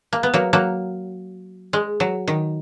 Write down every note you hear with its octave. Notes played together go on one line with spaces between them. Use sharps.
A#3
B3
F#3 A#3
F#3 A#3
G#3
F#3
D#3